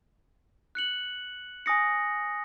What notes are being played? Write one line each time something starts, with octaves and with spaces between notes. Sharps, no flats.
F#6 C#7 F#7
G#5 D#6 A#6 C#7